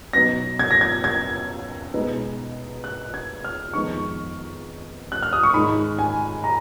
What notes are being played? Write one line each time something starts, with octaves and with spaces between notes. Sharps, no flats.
B2 F#3 B3 D#4 A#6
G#6
A#6
G#6
G#6
B2 G#3 B3 D#4
F#6
G#6
F6
F2 D#3 G#3 B3 D#4 C#6
F#6
F6
D#6
C#6
G#2 D#3 G#3 D#4 B5
G#5
A#5